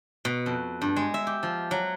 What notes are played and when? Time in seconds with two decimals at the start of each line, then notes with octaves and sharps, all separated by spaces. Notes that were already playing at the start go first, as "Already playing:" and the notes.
0.25 B2
0.46 F2
0.82 G2
0.96 G#3
1.14 E5
1.27 G4
1.43 F3
1.71 F#3